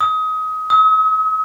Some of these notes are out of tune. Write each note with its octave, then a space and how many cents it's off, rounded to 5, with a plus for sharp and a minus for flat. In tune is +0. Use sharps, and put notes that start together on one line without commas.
D#6 +25
D#6 +45